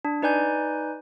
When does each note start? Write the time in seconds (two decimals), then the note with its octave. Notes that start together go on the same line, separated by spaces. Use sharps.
0.05 D4
0.22 D#4 B4 D5 G#5 G6